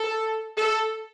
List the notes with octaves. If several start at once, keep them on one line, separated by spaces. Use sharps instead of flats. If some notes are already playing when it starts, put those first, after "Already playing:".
Already playing: A4
A4